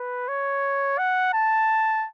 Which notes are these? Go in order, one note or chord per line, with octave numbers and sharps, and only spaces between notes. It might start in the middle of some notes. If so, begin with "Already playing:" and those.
Already playing: B4
C#5
F#5
A5